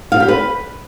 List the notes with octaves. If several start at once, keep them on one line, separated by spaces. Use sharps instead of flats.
F5
G4
B4